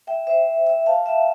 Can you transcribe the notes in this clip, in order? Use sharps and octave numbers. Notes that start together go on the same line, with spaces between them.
E5 G5
C5 E5
E5 G5
F5 A5
E5 G5